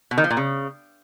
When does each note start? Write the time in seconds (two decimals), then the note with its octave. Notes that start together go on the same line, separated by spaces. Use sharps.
0.11 B2
0.18 D#3
0.24 F3
0.30 A#2
0.37 C#3